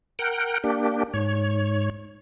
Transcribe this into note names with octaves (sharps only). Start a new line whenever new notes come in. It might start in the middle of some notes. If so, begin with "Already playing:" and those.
A#4 F#5 G5
A#3 D4 G4
G#2 C#5